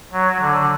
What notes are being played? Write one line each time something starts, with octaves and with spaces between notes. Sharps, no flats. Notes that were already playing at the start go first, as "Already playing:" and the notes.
F#3
D3